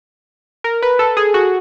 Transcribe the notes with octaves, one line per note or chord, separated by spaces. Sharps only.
A#4
B4
A4
G#4
F#4